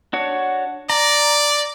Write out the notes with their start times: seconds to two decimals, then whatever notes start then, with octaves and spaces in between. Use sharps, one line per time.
0.13 D4 F#4 C#5
0.90 D5 A#5